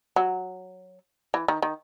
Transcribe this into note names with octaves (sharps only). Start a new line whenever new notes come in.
F#3
E3
D#3
D#3